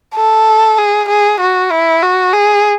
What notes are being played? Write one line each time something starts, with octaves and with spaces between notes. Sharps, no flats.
A4
G#4
G#4
F#4
E4
F#4
G#4